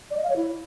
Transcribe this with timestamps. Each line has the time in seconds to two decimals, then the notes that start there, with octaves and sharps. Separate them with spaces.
0.11 D5
0.17 D#5
0.24 F5
0.30 C#5
0.36 E4